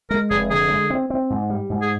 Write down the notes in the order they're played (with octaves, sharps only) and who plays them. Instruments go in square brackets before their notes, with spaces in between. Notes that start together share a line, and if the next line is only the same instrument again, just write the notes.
[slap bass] G#3 [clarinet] A#4
[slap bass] F1 [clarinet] G#4
[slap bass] D3 [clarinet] G#4
[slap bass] G#3
C4
C4
G#2
G3
G#2
[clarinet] G#4